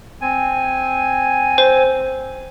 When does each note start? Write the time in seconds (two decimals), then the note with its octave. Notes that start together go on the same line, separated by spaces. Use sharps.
0.21 C4 G#5
1.58 C5